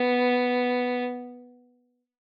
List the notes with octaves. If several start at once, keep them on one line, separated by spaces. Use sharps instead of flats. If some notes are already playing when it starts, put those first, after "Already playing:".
Already playing: B3